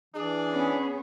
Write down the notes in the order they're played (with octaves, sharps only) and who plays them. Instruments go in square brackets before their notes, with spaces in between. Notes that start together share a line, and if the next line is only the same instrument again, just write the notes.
[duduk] E3 [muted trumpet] D4 [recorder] G#4
[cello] B3 C#4